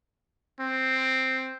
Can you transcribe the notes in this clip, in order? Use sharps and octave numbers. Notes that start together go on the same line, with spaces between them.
C4